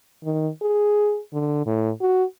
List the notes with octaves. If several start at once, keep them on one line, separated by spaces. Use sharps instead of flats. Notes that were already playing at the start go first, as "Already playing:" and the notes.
D#3
G#4
D3
A2
F#4